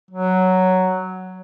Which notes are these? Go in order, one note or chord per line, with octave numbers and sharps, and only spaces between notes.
F#3